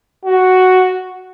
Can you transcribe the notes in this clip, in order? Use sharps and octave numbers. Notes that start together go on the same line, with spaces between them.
F#4